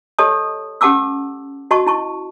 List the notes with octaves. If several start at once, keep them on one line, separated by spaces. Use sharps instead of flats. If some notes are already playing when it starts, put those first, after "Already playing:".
G4 A4 C#5 D#5 A5 D#6
C#4 G4 F#5 A5 D6 E6
F#4 D#5 A5 C#6
E4 A5 C#6